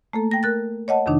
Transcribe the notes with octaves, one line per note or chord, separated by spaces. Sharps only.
A3 A#3 A4
G5 A#6
A#4 F#6 A6
C#5 D#5 F#5 A5
F2 C3 D#3 D4 D#4